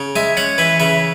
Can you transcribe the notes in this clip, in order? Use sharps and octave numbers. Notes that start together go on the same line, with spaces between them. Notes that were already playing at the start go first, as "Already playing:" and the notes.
Already playing: C#3
G#3 E5 G#5
C#4 C#5 F#5
E3 B4 E5
C#3 B4 E5